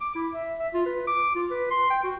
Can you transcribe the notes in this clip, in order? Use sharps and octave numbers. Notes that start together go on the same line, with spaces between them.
D6
E4
E5
E5
F4
B4
D6
F4
B4
C6
G5
F#4